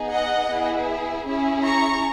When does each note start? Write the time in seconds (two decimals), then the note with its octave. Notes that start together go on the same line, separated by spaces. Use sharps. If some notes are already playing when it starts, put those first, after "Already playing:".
Already playing: B3 D#4 G#4
0.12 D#5 F#5
0.50 B3 E4 G#4
1.26 C#4 E4 G#4
1.65 A#5 C#6